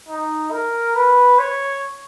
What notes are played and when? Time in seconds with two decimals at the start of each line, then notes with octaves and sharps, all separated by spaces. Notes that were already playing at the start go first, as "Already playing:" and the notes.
0.08 D#4
0.52 A#4
0.95 B4
1.38 C#5